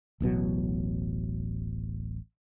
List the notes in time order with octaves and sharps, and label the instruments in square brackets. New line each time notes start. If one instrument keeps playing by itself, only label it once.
[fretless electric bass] D1 A1 B2 F#3